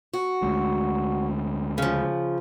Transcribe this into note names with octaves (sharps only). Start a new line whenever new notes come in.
F#4
D2 G#3
C#3 F3